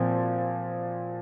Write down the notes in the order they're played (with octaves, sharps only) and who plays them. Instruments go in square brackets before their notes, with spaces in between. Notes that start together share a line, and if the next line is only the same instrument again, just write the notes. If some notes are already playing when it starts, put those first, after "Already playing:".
Already playing: [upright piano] A#2 F3 C4